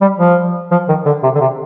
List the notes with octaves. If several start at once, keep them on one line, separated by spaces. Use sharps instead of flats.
G3
F3
F3
D#3
D3
C3
D3
C3